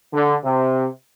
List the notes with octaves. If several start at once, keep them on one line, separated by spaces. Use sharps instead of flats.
D3
C3